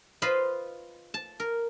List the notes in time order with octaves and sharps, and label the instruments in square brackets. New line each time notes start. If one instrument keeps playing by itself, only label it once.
[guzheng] F4 B4 C5 D#5 B5 C6
A5
A#4